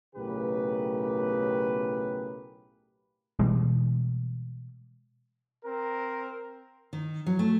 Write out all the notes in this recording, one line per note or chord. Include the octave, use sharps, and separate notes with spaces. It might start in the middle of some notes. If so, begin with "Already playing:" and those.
B1 A2 C#3 G4 A#4 B4
B2 E3 G3 G#3
C4 A#4
D#3
F#3
A3